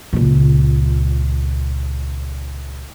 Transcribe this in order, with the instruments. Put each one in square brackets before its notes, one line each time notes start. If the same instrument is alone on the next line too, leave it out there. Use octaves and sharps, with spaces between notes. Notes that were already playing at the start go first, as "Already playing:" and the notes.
[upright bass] C#2 A#2